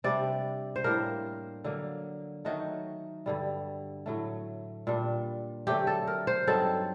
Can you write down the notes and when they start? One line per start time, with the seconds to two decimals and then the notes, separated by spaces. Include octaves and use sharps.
0.04 C3 G3 D4 D5
0.76 C5
0.84 A2 G3 A#3 D4 A#4
1.64 D3 F#3 A#3
2.45 D#3 F#3 A3 D#4 F#4
3.26 G2 D3 G3
4.06 A2 F#3 A3
4.87 A#2 G3 D4
5.67 D3 F#3 A3 C4 G4
5.87 A4
6.07 A#4
6.27 C5
6.47 G2 F#3 C4 D#4 A4